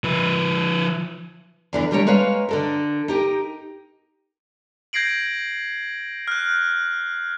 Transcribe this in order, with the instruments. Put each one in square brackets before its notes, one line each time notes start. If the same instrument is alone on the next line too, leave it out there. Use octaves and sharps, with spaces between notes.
[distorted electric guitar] F3 B4
[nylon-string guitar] E2 D3 E3
D3 G3 A3 A#4 C#5
G#3 A#3 B4 C#5 F5
D3 A4 A#4
D#4 G4 A#4
[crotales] G6 G#6 A#6 C7 D7 F#7
F6 F#6